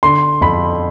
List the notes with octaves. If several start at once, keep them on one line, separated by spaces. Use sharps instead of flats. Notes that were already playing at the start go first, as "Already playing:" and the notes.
D3 C6
F2 B5